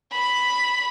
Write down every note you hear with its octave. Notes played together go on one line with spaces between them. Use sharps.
B5